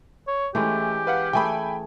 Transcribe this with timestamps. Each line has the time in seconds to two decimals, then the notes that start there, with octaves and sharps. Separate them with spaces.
0.28 C#5
0.55 E3 G#3 A3 C#4 G4
1.07 B4 F5 F#5
1.33 E3 A3 G#4 G5 G#5 B5